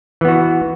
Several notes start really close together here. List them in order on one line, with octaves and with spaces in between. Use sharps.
E3 B3 F#4